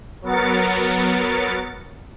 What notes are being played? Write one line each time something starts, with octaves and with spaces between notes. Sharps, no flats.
F#3 B3 A#4 A6 C#7